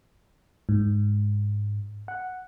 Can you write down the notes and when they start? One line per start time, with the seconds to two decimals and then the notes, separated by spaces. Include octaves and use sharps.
0.69 G#2
2.08 F#5